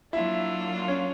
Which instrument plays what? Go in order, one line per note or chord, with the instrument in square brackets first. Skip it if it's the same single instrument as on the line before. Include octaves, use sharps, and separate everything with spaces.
[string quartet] F#3 A#3 D4 F4 [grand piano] E4 E5
[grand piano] C#4 C#5